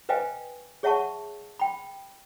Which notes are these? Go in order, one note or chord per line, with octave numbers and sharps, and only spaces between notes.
B4 C5 D#5 F5 G5 G#5
G#4 C#5 E5 F#5 A5 C#6
G5 B5